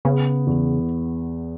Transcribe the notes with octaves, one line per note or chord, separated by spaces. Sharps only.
C#3 B3
E2